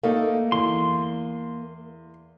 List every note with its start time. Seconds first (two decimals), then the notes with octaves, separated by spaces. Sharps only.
0.03 A3 A#3 D#4 A4
0.52 E2 C6